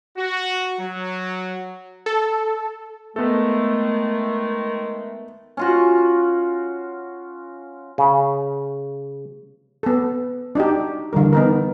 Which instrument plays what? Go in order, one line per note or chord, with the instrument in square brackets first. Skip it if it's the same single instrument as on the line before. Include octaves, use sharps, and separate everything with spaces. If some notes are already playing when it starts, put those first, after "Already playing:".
[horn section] F#4
F#3
[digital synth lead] A4
[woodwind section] D#3 G#3 A3 [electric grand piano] B3 A4
[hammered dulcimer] C#4 F4 F#4
[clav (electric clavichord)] C#3
[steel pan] B3 A4
D4 D#4 F#4 G4
D3 E3 G3 A#4
B3 D#4 A#4